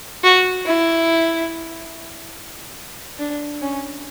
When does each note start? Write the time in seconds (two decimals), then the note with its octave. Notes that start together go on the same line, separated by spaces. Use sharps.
0.24 F#4
0.66 E4
3.19 D4
3.62 C#4